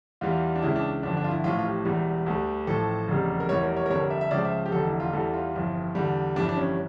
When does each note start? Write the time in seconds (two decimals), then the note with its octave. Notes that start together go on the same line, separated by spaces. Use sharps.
0.21 E2 E3 G3 F4
0.56 D4
0.62 C#2 C#3 E3 E4
0.76 D4
1.03 G1 F2 D3 D4
1.17 D4
1.24 F4
1.31 E4
1.44 A1 A2 F3 F4
1.59 F4
1.65 G4
1.85 E1 E2 E3 G3
2.26 D2 D3 G3
2.67 A1 A2 F3 A4
3.08 F1 E2 C#3 G3
3.40 A#4
3.49 F1 E2 E3 G3 C#5
3.63 A#4
3.77 C#5
3.86 A#4
3.90 F1 F2 D3 G3 C#5
4.01 A#4
4.10 E5
4.21 E5
4.31 C#2 C#3 F3 D5
4.45 E5
4.66 G4
4.72 F1 E2 D3 A4
4.86 E4
5.00 F4
5.13 E2 E3 G3 A4
5.33 F4
5.54 G1 F2 E3
5.95 E2 D3 G3
6.36 G1 F2 E3 G3 D4
6.49 D4
6.57 C#4